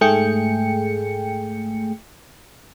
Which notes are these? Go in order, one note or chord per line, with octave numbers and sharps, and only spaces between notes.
G#2 A3 G#4 G5 C#7